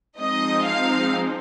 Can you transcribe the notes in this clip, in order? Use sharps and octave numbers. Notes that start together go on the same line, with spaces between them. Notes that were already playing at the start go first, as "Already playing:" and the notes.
F3 G#3 C4 D#4 D#5
F5